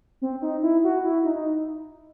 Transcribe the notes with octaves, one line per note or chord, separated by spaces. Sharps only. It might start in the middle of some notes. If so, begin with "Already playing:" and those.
C4
D#4
E4
F#4
E4
D#4
D#4